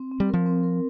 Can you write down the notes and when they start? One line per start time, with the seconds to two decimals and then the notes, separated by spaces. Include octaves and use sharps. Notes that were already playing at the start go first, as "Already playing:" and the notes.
Already playing: C4
0.12 C4
0.20 G3
0.29 F3 A#4
0.46 C4
0.63 A#4